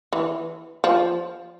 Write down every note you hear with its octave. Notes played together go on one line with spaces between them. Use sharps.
E3
F3